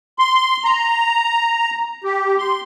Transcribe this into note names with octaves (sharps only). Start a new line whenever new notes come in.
C6
A#5
G4
C6